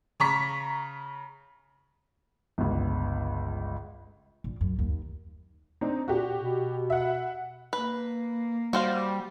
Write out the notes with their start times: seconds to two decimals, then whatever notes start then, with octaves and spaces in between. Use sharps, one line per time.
0.20 C#3 A#5 C#6 B6
2.58 G1 C#2
4.44 A#1
4.61 F#2
4.79 D#2
5.81 C4 D4 D#4
6.08 A#2 F#4 G4
6.35 B2
6.90 E5 F#5
7.73 A#3 B4
8.73 G3 F#4 C5 F5